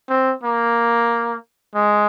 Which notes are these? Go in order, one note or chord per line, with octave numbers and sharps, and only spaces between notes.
C4
A#3
G#3